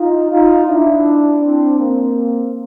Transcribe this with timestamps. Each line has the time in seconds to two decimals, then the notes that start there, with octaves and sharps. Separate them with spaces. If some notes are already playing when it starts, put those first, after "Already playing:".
Already playing: D#4 F4
0.30 D#4 F4
0.68 D4 E4
1.42 C4 D4
1.79 A#3 C4